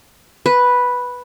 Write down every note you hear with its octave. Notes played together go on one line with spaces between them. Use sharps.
B4